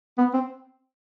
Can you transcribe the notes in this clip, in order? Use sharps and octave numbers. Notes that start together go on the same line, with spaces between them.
B3
C4